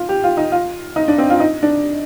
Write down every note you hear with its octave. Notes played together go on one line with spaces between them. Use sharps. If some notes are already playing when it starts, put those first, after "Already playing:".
Already playing: F4
G4
F4
D#4
F4
D#4
D4
C4
F4
D#4
D4